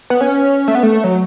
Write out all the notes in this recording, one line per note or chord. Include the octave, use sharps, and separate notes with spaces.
B3
C#4
A3
B3
A3
F#3